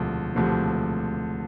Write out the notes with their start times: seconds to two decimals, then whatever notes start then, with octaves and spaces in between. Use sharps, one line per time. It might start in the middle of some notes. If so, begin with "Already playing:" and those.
Already playing: E1 D2 C3 F3 A3
0.35 E1 D2 C3 F3 A3